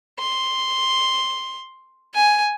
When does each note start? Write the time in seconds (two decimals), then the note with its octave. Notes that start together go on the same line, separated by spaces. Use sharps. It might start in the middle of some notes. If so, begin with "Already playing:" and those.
0.19 C6
2.14 G#5